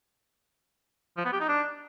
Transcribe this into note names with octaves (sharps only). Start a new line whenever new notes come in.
F3
B3
G4
D#4
D4